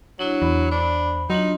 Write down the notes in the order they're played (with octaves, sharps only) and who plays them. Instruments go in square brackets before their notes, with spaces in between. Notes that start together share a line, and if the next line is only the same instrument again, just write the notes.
[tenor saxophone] F#3 [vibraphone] D4 E4
[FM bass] E2 [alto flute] B5
[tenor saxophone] D4 [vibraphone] C5 [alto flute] B5
[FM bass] F#3 [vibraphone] D4 F4 C6 [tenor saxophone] D#4